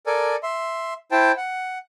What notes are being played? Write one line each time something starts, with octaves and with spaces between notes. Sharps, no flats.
A4 A#4 D5 G#5
E5 C6
E4 C5 G5 A5
F#5